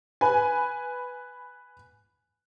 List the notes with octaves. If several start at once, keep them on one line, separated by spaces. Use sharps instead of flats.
B4 G#5